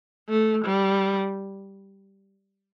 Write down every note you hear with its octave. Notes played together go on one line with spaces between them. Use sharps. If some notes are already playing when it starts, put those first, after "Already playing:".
A3
G3